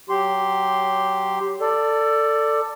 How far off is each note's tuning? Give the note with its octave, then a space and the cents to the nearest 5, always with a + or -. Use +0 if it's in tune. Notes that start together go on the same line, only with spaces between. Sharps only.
F#3 +15 G4 +0 C6 -5
A4 +20 D5 +0